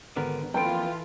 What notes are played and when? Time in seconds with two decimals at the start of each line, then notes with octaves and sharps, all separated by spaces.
0.16 G#1 D3 B3 A#4
0.54 F2 E3 A#3 F4 A4 B4 G5 D7